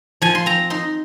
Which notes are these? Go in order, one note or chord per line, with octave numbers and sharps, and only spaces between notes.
F3 G#5
C6
C4 A#5
D#4 C6